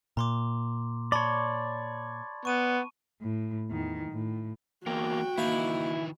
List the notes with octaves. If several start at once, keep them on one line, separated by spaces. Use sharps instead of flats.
A#2 A#5 C6 D6
C#5 D5 A5 B5 C6
B3 C#6 D#7
A2
E2 D#3
A2
E2 A#3 F#4 G5
D#3 E3 A#3 D#4 E4 G5